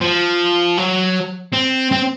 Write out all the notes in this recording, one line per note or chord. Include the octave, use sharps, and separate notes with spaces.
F3
F#3
C4
C4